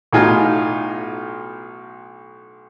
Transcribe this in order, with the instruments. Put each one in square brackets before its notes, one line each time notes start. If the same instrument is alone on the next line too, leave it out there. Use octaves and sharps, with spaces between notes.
[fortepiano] B1 A2 D#4 F4 G#5